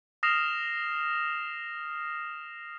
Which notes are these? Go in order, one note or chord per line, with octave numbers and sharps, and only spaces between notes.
D#6 F6 A#6 C7 E7 F7